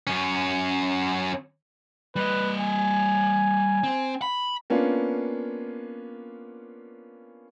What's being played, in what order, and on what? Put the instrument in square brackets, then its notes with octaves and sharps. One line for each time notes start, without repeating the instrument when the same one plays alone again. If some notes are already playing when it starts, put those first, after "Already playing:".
[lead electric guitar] F#2 C#4
[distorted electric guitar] G3 D#5 [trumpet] B4
[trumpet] G#5
[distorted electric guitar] C4 C5
B5
[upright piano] A#3 B3 C#4 D4 F4